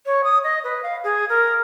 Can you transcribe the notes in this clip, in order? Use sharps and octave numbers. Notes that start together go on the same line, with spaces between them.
C#5
D#6
D#5
B4
F5
G#4
A#4